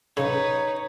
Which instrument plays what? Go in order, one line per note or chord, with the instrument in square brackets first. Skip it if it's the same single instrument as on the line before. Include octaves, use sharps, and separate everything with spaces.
[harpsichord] C#3 [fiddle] D#4 B4 [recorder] C#5